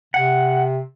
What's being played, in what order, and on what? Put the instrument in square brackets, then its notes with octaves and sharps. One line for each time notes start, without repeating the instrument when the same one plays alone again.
[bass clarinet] C3 [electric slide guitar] F#5